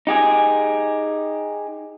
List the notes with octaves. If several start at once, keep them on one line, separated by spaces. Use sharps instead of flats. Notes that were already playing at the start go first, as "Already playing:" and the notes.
D#4 G4 G#4